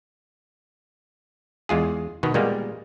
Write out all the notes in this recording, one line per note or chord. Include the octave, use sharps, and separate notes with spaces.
E2 G#3 F4 G#4
B2 D#3 B3
A#2 G3 G#3 A#3 B3